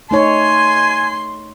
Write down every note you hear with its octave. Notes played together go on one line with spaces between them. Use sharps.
A3 D#4 C#5 G#5 C6